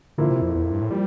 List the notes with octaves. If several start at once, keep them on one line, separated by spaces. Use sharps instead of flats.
A#2 D3 F3 A#3 E4
C3
F2
E2
F2
G2
A2
F3 G3 A#3